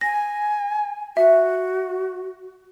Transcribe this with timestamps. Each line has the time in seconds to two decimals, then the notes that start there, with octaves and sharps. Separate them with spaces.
0.01 G#5 A#6
1.17 F#4 E5